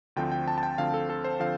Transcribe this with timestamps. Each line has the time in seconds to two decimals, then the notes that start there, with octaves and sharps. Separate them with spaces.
0.16 D2 D3 F3 C4 G5
0.32 G5
0.48 A5
0.58 A5
0.63 G5
0.78 D2 D3 F3 C4 F5
0.94 A4
1.10 A4
1.24 C5
1.40 D3 F3 C4 F5